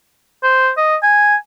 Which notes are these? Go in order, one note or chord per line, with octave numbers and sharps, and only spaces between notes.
C5
D#5
G#5